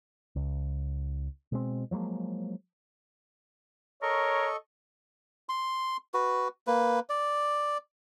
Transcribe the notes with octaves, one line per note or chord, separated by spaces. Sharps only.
C#2
B2 G#3 C4
F3 F#3 G#3 A#3
A4 A#4 C#5 D#5 C#6
C6
F#4 B4
A#3 B4
D5